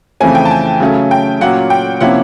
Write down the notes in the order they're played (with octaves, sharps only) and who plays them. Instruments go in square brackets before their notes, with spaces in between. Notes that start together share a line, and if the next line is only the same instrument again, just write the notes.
[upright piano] F2 C#3 E3 A3 C4 [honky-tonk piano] G#5
[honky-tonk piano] G5
A5
G#5
[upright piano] C#3 F#3 A3 C#4
[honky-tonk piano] G5
[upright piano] A#2 F#3 A#3 C#4 F4 [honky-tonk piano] F#5
[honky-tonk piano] G5
[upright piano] C3 F3 A#3 C#4 E4 [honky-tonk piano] F#5